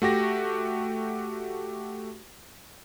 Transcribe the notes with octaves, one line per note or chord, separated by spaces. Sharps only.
A3 F#4 G4 A#6